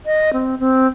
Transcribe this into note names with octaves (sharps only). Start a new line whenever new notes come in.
D#5
C4
C4